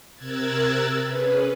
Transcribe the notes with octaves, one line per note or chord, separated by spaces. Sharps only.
C3 A#4 E6 F#6 G#6 A6
C#4 G#4 B4